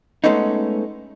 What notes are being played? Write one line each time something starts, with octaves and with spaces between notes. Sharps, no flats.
G#3 A3 B3 C#4 D#4